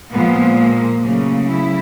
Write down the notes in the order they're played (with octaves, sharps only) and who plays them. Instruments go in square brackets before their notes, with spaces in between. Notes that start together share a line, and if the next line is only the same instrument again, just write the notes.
[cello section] A#2 F3 G#3 B3
A#3
C#3 F#3 A3 A#3
E4